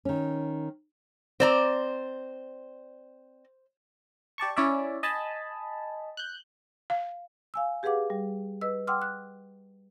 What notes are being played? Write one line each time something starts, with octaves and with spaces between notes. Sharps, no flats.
D#3 C#4
C4 C5 D5 A#5
G4 D5 A5 C#6
C#4 E4 C#5 D5 E5
D#5 G#5 A5 B5
F#6 G6
F5
F5 G#5 E6
G4 G#4 B4 F5 F#5 D6
G3
B4 D#5 E6
F#5 G5 C6 D6 E6 F6
F#6